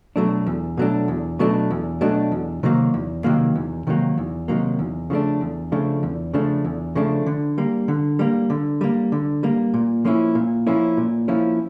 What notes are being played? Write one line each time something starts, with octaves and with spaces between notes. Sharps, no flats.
B2 F#3 A3 D4
E2
B2 F#3 A3 D4
E2
B2 F#3 A3 D4
E2
B2 F#3 A3 D4
E2
C3 D#3 F#3 A#3
E2
C3 D#3 F#3 A#3
E2
C3 D#3 F#3 A#3
E2
C3 D#3 F#3 A#3
E2
C#3 F3 A3 D4
E2
C#3 F3 A3 D4
E2
C#3 F3 A3 D4
E2
C#3 F3 A3 D4
D3
G3 A#3
D3
G3 A#3
D3
G3 A#3
D3
G3 A#3
A#2
F3 A#3 C#4 E4
A#2
F3 A#3 C#4 E4
A#2
F3 A#3 C#4 E4